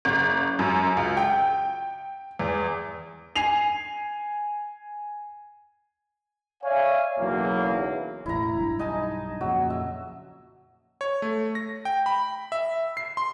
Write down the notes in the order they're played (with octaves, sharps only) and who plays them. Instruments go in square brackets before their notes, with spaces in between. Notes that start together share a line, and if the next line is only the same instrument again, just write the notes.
[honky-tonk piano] F#1
F#2
C#2
G5
E2
[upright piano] G#5 C7 F7
[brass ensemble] C#5 D5 E5 F5 G#5
B1 E2 C#3 F#3 A#3
[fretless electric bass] E1 A1 [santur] E4 A#5
[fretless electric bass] B1 G2
[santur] D#4 G#5 A5
[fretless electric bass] F2 A#2 C#3 [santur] F#3
[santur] E5
[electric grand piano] C#5
A3
A#6
G5
B5
E5
C7
C6